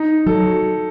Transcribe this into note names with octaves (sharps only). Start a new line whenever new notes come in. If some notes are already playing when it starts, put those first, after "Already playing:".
Already playing: D#4
F#3 A4